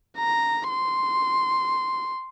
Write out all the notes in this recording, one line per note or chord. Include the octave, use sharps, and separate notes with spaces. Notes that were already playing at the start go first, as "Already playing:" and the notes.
A#5
C6